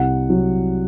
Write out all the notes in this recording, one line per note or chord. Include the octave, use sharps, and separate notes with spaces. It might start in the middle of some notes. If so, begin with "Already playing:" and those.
Already playing: C2 F#5
F#3